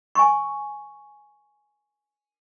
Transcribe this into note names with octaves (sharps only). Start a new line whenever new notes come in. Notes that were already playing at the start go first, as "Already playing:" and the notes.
G#5 C#6